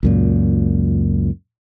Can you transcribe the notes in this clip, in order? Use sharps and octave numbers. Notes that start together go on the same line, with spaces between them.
C#2 F#2 A#2